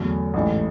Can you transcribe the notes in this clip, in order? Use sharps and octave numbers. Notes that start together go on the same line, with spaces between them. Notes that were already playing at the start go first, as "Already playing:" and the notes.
Already playing: E2 D3 F#3 A3
A1 G#2 E3 A3